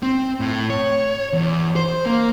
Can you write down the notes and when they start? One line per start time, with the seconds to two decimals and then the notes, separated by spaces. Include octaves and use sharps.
0.03 C4
0.40 A2
0.70 C#5
1.33 E2
1.76 C5
2.06 A#3